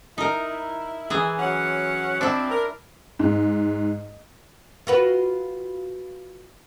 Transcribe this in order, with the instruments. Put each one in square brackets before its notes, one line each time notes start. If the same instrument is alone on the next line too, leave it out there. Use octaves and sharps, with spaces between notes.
[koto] D#4 A#4 [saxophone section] E4
[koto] E3 G#4
[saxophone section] F#3 C#4 F#5
[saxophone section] F3 C4 [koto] D4 E4
[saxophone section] A#4
[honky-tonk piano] G#2
[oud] F4 F#4 B4